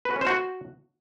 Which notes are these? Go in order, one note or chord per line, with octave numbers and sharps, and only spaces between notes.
B4
F#4
C#4
C5
F#4